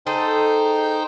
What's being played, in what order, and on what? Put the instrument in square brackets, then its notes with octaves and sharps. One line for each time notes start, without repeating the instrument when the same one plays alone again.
[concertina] D#4 C5 G5 [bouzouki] G#4 A4